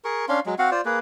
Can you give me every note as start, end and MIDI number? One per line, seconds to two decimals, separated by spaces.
0.05 0.26 68
0.05 0.26 70
0.05 0.26 85
0.29 0.40 61
0.29 0.40 62
0.29 0.40 77
0.29 0.40 84
0.46 0.55 54
0.46 0.55 56
0.59 0.70 60
0.59 0.70 66
0.59 0.70 77
0.59 0.70 78
0.71 0.81 65
0.71 0.81 72
0.71 0.81 74
0.85 0.99 58
0.85 0.99 68
0.85 0.99 71